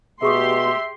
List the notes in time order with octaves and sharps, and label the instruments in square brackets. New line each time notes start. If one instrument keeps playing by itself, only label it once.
[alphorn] B2 [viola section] G4 C6 [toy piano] G#4 C#6 D#6 [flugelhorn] E5